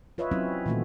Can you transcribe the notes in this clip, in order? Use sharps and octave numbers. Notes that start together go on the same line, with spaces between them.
F4 B4 C#5 D#5 E5
F#3 C4 C#4 E4
A#2 D#3 E3 A3 C4 F#4